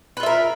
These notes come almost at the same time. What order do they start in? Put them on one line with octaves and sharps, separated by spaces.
B4 F4 E5 A#4